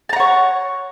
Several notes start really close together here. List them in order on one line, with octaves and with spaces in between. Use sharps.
A5 A#5 F#5 C#5